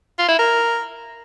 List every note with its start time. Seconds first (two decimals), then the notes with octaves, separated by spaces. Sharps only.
0.18 F4
0.29 E4
0.39 A#4